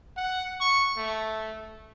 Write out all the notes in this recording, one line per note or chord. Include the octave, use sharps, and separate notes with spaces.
F#5
C#6
A3